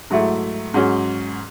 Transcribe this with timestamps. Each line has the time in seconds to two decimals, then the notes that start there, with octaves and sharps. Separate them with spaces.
0.10 G#2 F#3 A3 E4
0.74 G#2 F#3 C#4